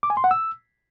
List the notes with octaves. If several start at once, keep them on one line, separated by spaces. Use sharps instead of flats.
D6
G#5
C6
F#5
E6